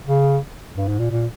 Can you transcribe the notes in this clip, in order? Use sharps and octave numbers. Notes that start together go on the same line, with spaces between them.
C#3
G2
G#2
A#2
A#2